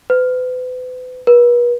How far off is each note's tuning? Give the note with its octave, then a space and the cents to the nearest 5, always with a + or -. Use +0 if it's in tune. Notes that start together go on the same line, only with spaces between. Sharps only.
B4 +40
B4 -40